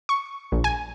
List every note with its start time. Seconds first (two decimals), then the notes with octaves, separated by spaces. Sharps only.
0.09 C#6
0.52 A#1
0.64 G#5